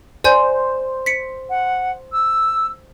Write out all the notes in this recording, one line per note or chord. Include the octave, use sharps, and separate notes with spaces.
C5 D5 G#5 G6
B6 C#7
F#5
E6